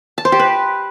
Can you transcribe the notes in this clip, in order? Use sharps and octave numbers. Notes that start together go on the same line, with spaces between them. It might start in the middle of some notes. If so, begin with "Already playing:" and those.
A5
C5
G4
B4